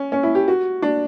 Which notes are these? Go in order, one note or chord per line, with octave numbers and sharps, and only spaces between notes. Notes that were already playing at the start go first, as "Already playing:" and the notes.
Already playing: C#4
C#4
E4
G4
F#4
D4